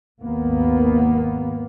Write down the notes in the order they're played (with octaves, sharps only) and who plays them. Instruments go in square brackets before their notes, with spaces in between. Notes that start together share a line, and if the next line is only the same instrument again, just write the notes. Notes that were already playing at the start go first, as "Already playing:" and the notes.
[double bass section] G#1 D#2 A#3 B3